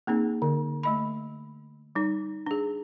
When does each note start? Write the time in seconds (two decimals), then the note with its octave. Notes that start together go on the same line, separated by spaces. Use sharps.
0.07 A#3 C4 D#4 G#4
0.42 D3
0.83 A3 D#5 B5
1.95 G3 D#4
2.46 D4 G#4